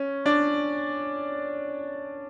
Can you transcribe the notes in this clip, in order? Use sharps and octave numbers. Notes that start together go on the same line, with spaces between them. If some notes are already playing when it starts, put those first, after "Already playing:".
Already playing: C#4
D4 D5